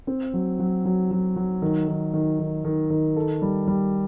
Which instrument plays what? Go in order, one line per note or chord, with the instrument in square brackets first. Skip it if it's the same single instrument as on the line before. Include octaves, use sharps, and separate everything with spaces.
[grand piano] C4
F#3
F#3
F#3
F#3
F#3
D#3
D#3
D#3
D#3
D#3
D#3
A4
G3
G3